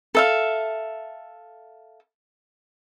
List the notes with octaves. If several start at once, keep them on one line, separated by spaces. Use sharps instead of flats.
A4 E5 F5